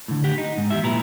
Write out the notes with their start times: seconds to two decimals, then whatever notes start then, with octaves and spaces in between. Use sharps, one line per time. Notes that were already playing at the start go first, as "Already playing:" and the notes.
0.08 A2 D3
0.24 G4 F#5
0.38 D#4
0.58 G#2
0.70 E2 G4 E5
0.83 A#2 F3 E4 B4 A#5